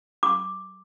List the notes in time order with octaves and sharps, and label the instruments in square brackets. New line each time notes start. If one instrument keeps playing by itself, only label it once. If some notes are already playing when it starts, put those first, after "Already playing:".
[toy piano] D6